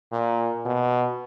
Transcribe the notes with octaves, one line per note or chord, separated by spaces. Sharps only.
A#2
B2